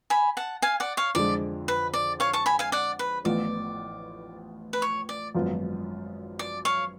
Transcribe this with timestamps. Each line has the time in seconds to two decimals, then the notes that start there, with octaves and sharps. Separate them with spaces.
0.10 G#5 B5
0.37 F#5 A5
0.62 F5 G#5
0.80 D5 F#5
0.97 C#5 F5
1.15 F2 D3 G#3 D5
1.68 B4
1.94 D5
2.20 C#5 F5
2.33 A5 C#6
2.46 G#5 B5
2.59 F5 G#5
2.72 D5 F#5
2.99 B4
3.25 A1 A2 F3 B3 F4 D5
4.73 B4
4.82 C#5
5.09 D5
5.35 G#1 F#2 F3 B3 F4
6.39 D5
6.65 C#5 F5